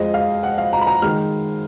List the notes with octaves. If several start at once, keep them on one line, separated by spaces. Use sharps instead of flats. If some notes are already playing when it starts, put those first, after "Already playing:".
Already playing: F2 F3 G#3 D#5
F5
F#5
F5
A#5
B5
A#5
D#3 G#3 F6